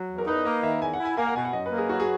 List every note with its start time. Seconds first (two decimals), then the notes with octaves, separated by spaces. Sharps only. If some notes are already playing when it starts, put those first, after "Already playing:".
Already playing: F#3
0.09 E2
0.18 A#4
0.27 D#4 B4
0.45 A#3 D#5
0.63 D#3 E5
0.82 E2 G#5
0.93 F#5
1.00 E4
1.05 G#5
1.17 A#3 G#5
1.26 F#5
1.36 B2 G#5
1.45 F#5
1.53 F#2 D#5
1.66 B4
1.72 A#3
1.78 G#4
1.89 F#3 F#4
2.00 G#4